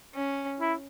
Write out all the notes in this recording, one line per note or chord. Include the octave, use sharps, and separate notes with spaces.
C#4
E4